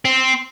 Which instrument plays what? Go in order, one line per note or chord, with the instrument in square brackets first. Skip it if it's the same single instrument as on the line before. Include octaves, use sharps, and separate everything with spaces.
[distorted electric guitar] C4